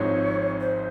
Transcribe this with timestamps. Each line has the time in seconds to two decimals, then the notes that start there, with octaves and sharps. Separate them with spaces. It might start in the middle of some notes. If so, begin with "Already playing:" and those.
Already playing: G#1 G#2 F3 C4 D#4 C#5
0.60 C5